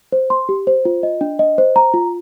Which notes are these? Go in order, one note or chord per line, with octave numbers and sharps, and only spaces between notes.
C5
C6
G4
C5
F4
D#5
D4
D#5
C5
A#5
F4